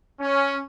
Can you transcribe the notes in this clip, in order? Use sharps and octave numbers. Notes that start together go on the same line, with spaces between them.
C#4